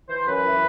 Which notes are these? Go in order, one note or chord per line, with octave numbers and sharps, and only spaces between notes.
E3 C5
F#2 B4
E3